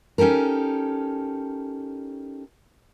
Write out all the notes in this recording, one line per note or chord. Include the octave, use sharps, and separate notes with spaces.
C#4 D#4 G4 A4 A#4